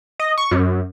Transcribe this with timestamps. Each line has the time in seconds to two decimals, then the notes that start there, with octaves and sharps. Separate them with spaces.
0.19 D#5
0.38 C#6
0.51 F#2